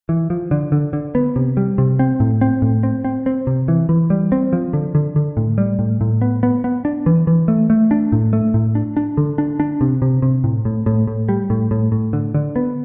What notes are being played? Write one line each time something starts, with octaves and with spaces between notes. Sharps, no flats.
E3
F3
D3
D3
D3
B3
C3
G3
C3
C4
A2
C4
A2
C4
C4
C4
C3
E3
E3
G3
C4
F3
D3
D3
D3
A2
G3
A2
A2
B3
B3
B3
D4
E3
E3
A3
A3
D4
A2
A3
A2
D4
D4
D3
D4
D4
C3
C3
C3
A2
A2
A2
A2
G3
A2
A2
A2
D3
D3
B3